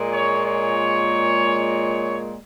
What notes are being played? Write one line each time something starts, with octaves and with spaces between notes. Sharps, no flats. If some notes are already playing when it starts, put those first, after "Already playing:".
Already playing: A#2 G#3
C#5
C#5